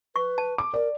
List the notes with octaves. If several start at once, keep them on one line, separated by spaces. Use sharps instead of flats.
B4 C#6
A5
D6
A#4 D5